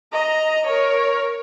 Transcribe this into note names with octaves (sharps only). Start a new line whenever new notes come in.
D#5 A#5
A#4 C#5